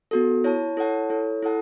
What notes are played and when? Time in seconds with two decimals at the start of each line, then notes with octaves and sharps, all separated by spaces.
0.11 B3 F#4 A4
0.44 E4 C#5 A5
0.77 E4 A4 C#5 F#5 A5
1.10 E4 A4 C#5
1.43 E4 A4 F#5 A5